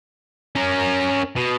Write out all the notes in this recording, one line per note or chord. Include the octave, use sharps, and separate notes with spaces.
C#4 A#4
B2